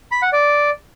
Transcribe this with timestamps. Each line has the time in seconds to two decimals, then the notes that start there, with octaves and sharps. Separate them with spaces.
0.12 B5
0.22 F#5
0.33 D5